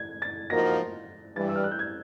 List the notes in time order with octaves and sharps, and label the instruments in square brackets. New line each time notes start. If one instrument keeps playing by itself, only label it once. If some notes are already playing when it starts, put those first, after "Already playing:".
Already playing: [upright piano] G#6
A6
[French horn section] F3 A#3 D#4 F#4 A#4 [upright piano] A#6
[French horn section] G2 E3 G3 [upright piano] A6
[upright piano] E6
F6
F#6
G6
G#6